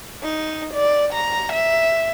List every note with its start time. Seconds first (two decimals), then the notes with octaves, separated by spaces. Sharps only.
0.23 D#4
0.74 D5
1.13 A#5
1.52 E5